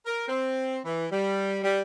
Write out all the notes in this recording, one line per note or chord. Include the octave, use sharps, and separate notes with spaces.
A#4
C4
E3
G3
G3